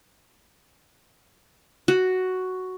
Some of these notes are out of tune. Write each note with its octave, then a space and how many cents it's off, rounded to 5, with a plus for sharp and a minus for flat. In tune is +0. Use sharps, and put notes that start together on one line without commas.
F#4 +5